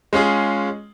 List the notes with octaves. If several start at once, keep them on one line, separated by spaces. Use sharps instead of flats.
G#3 C#4 F4 G#4